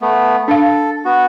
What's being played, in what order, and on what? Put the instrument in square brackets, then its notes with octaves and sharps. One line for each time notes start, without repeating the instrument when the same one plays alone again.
[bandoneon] A3 B3
[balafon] D4 F5 [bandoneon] A4
[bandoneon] B3 F#4